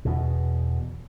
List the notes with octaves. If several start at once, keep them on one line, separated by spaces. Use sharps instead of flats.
E2 B2